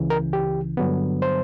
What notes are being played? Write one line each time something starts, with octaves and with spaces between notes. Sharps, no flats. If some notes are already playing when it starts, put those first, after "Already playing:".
Already playing: C#2 C#3 E3
A#4
G4
G2 D3 F#3 B3
C5